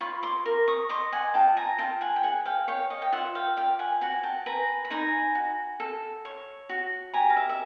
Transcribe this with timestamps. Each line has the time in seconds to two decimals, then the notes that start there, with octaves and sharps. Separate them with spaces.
0.01 F4 B5 C#6
0.23 C6 D6
0.46 A#4
0.68 C#6 D#6
0.89 D#5 C6 D6
1.12 F#5 G#5
1.34 F4 G5 A5
1.57 G#5 A#5
1.78 F4 G5 A5
2.01 F#5 G#5
2.16 G5
2.23 G#4 F#5 G#5
2.46 F5 G5
2.68 C#5 F5 G5
2.90 D#5 F5
3.02 G5
3.12 F4 E5 F#5
3.35 F5 G5
3.57 D5 F5 G5
3.79 F#5 G#5
4.01 F#4 F#5 G#5
4.23 G5 A5
4.46 B4 G#5 A#5
4.85 B5
4.90 D#4 G#5 A#5
5.35 F#4
5.80 A4
6.25 C#5
6.69 F#4
7.13 G4 G#5 A#5
7.30 F5
7.36 E5
7.49 E5